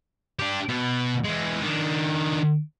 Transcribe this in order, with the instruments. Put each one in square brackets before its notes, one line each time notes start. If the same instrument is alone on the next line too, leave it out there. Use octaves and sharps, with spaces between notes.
[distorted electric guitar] D4 G4
B2
E3 G#3
D#3 D4